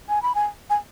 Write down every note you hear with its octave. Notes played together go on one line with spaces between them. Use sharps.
G#5
B5
G#5
G#5